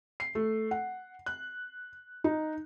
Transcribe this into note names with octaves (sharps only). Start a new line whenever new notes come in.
C7
A3
F#5
F#6
D#4